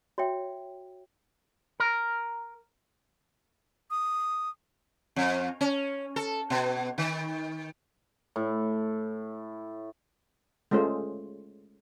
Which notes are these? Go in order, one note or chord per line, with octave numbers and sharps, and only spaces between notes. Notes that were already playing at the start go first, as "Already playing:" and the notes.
F#4 C#5 E5 G5
A#4
D#6
F2
C#4
A4
B2
D#3
A2
G#3 A3 C#4 F4 C5